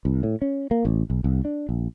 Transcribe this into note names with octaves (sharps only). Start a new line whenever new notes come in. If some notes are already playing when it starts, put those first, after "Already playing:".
C2
A2
C#4
A#3
A1
B1
C2
D4
A#1